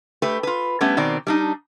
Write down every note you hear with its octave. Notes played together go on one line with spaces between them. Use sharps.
A3 G4 B4
F4 B4
G3 A3 B3 C#4
B2 D#3 C4 D5
G3 D4 D#4